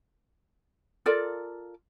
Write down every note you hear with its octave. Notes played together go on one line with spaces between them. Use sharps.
F4 A4 A#4 D5